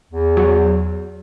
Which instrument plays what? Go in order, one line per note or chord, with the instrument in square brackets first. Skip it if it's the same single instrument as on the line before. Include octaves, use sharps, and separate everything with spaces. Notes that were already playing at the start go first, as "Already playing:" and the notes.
[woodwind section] E2
[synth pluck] F#3